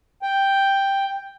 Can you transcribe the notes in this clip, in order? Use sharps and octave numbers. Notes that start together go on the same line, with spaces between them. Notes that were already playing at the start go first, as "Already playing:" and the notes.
G5